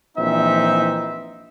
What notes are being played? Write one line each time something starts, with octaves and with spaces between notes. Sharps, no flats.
A#1 E3 C4 D#4 E5